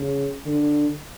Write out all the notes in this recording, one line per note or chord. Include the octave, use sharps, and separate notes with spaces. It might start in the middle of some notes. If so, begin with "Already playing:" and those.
Already playing: C#3
D3